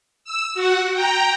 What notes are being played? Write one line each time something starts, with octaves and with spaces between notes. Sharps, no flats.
E6
F#4 F#5
G5 A#5